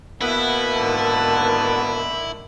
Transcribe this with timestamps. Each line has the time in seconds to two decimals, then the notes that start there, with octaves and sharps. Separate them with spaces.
0.21 B2 A#3 B3 E4 E5
0.76 G#2 D3 D#3 A5